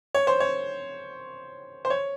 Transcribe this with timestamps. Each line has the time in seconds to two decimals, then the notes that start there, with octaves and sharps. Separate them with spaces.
0.15 C#5
0.27 C5
0.40 C#5
1.85 C5
1.90 C#5